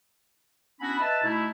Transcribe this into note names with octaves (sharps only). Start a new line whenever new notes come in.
B3 C#4 D4 E4 F#4 B5
B4 D#5 E5 A5
B2 A3 D#4 E4